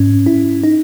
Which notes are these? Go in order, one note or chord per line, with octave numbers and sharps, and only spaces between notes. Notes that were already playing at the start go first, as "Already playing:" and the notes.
Already playing: G#2 C#4
E4
D#4